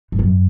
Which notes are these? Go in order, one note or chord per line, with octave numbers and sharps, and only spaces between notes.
G#2
F#2